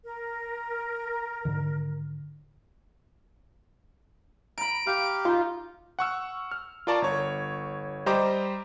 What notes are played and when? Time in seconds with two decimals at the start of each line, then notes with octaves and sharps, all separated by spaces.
0.04 A#4
1.45 G#2 D3 D#3
4.58 A#5 B5 D7
4.87 G4 F5
5.25 D#4 F4
5.99 F#5 C#6 E6 F6
6.51 F6
6.87 F4 A#4 D5 A5 A#5 C#6
7.02 G1 C#5
8.06 G3 G4 C5 D#5 A#5 D6